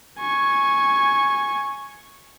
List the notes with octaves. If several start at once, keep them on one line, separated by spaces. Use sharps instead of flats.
G#5 C#6